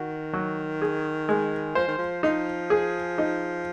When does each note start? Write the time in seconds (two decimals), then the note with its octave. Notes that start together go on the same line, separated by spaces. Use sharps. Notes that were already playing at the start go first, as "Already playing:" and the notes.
Already playing: D#3 F#4
0.33 F#3
0.82 G#4
1.29 G#3
1.75 F3 C5
1.88 D#3
1.98 F3
2.23 F3 D#4
2.70 G#4
3.18 D#4